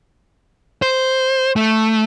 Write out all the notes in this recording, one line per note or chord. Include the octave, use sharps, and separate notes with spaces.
C5
A3